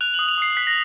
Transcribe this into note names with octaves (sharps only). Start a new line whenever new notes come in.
F#6 F7
F#7
D#6
F7
D#6 C7
F#6 B6
A#6